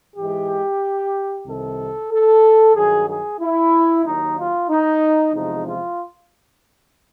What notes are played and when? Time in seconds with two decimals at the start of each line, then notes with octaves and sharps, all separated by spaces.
0.16 G#2 E3 G#3 G4
1.46 C2 C3 D#3 A4
2.11 A4
2.76 G2 D#3 F#3 G#4
3.08 G#4
3.40 E4
4.05 D#2 D#3 F#3 D#4
4.38 F4
4.70 D#4
5.34 E2 C3 F3 G#3 D#4
5.67 F4